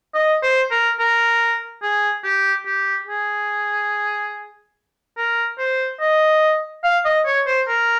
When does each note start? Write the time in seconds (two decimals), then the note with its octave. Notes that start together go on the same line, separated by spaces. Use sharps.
0.15 D#5
0.43 C5
0.71 A#4
0.99 A#4
1.82 G#4
2.24 G4
2.66 G4
3.07 G#4
5.17 A#4
5.59 C5
6.00 D#5
6.84 F5
7.05 D#5
7.26 C#5
7.47 C5
7.68 A#4